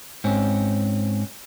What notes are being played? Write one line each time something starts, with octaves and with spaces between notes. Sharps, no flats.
G#2 C4 C#4